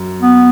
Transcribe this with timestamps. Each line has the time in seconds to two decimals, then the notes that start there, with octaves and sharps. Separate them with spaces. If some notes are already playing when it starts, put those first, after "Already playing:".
Already playing: F#2
0.22 B3